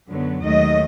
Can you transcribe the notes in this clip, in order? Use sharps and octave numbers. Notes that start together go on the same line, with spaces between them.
F#2 D3 F#3 B3
D#2 D#3 F#3 A3 D#5